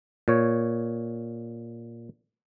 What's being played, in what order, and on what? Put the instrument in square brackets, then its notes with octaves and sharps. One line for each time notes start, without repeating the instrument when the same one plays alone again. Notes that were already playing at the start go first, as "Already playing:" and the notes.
[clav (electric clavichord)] A#2 C#5